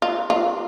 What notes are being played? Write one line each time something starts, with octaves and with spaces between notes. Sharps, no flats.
F4
F4